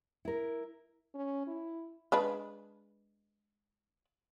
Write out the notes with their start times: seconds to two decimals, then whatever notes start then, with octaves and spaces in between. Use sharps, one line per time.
0.25 E4 A#4
1.14 C#4
1.47 E4
2.12 G#3 D4 B4